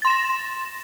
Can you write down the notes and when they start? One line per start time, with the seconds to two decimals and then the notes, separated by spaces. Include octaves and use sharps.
0.02 A6
0.05 C6
0.07 E7
0.10 A#6